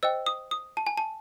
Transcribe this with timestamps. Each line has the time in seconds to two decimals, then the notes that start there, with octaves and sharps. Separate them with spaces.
0.03 C5 D#5 G5 E6
0.26 D#6
0.51 D#6
0.77 A5
0.87 G#5
0.97 A5